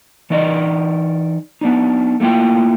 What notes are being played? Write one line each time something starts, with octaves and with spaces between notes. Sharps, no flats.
E3 D#4 D5 D#5
B3 D4 D#4
A3 A#3 E4 F4 G5